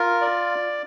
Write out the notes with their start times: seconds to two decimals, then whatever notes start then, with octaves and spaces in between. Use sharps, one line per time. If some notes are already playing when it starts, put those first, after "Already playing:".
Already playing: F4 A#4
0.21 D5